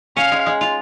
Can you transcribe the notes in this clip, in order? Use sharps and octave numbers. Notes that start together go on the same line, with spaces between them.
C#4 F5
G#3
G#3
F4